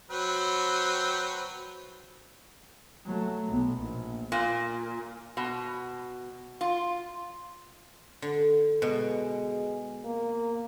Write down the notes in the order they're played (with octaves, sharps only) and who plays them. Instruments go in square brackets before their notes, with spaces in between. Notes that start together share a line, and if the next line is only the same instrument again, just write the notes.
[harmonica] F#3 C4 B4
[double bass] F#3 A3
B1 B3
A#1
[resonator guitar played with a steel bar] A#2
B2
F4
[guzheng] D3
[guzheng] B2 [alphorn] G#3
[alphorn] A#3